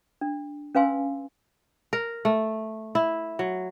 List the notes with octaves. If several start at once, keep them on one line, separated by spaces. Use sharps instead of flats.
D4
C#4 B4 F5 G#5 C6 E6
A#4
A3
E4
F#3